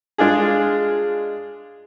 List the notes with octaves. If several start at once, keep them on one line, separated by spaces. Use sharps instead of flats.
G#3 D4 F4 G#4